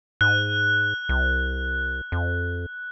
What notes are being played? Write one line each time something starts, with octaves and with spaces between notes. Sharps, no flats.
G#2 F#6
C2
F2